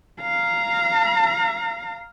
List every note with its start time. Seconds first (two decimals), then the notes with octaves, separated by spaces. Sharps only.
0.21 F5 A#5